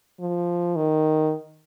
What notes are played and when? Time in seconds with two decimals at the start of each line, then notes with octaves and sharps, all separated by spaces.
0.20 F3
0.76 D#3